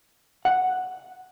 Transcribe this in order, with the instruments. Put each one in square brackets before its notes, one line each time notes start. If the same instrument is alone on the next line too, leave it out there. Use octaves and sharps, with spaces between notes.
[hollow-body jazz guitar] F#5